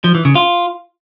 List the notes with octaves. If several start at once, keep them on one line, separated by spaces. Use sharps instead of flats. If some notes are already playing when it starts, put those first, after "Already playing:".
F3
E3
C#3
F4